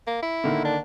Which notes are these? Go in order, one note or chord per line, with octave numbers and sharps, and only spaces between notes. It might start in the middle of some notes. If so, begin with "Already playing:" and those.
A#3
E4
D3 D#3 A#3
D4